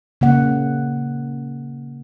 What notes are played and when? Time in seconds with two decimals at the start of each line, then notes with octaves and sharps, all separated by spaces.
0.21 C#3 A#3 F#5